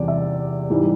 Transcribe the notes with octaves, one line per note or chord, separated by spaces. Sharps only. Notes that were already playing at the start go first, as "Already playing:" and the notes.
Already playing: E2 C3 E3 G3 D5
E5
G#2 E3 G3